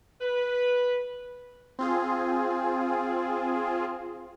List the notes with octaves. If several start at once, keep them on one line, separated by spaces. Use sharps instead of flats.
B4
C4 F4 G#4